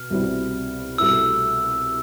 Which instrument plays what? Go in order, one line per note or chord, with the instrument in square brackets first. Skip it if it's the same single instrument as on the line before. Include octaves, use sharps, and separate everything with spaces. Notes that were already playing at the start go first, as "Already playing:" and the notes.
Already playing: [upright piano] B2 [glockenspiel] F6
[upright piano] C2 B2 G3 C4 E4
[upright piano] C2 B2 A3 E4 [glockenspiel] E6